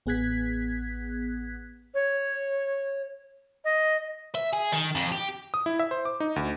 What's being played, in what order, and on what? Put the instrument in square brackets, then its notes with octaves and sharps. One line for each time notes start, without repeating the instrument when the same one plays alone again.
[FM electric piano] A1 B3 G#4 F#6 G#6 B6
[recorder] C#5
D#5
[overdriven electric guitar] E5
G#4
D#3
F2
G4
[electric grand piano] D#6
E4
E5
C5
D6
D#4
D2